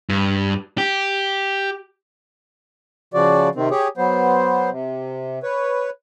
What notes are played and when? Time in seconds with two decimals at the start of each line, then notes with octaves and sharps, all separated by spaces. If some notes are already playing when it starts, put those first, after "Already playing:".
0.10 G2
0.78 G4
3.14 C#3 F3 F#4 D5
3.55 C3 D#3 C4
3.71 G4 G#4 C#5
3.97 F#3 B3 C5
4.70 C3
5.43 B4 C#5